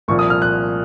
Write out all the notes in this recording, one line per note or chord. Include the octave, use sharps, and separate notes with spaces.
C2 A#2 F3 C#6
D#6
F6
F#6